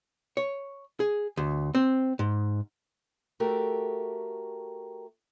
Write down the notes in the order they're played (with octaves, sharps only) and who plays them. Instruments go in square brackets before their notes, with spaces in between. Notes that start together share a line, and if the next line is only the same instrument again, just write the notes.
[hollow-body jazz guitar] C#5
G#4
D2
C4
G#2
[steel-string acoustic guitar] A3 F#4 G4 A4 A#4